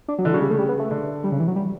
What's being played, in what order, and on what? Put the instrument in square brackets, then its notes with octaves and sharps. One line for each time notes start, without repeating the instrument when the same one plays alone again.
[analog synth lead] D4
F#3
[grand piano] D3 [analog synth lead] E3
[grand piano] C#3 [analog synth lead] F#3
[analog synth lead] G3
[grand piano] C#3 [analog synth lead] A3
[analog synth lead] G3
B3
A3
[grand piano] D3
[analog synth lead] G3
C#3
E3
F#3
G3